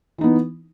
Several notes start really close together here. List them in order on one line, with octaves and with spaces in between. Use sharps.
E3 D#4 B3